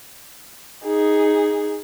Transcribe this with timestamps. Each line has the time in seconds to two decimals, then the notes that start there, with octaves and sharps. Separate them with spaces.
0.86 D#4 G#4